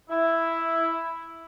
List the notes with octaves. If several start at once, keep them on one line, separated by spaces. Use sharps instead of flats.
E4